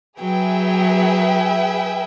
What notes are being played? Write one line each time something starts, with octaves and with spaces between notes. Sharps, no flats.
F#3 G#4 B4 E5 G5